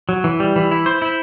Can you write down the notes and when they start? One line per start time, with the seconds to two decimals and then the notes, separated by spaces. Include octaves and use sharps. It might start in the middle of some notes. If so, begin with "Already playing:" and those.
0.09 F#3
0.24 E3
0.40 G3
0.56 E3
0.71 E4
0.86 C5
1.02 E4